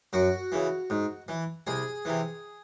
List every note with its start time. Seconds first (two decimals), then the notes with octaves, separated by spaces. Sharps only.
0.13 F#2 F#4
0.52 C#3 E3
0.90 G#2
1.28 E3
1.67 C2 G#4
2.05 C3 E3